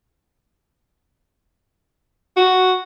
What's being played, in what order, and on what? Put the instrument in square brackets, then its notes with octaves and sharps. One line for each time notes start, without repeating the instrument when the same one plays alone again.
[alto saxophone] F#4